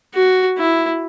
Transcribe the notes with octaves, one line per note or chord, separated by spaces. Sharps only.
F#4
E4